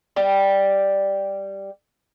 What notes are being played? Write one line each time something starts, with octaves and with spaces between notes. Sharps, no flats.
G3 G4